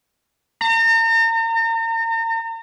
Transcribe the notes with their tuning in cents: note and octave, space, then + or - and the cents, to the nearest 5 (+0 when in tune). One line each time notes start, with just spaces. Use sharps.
A#5 -40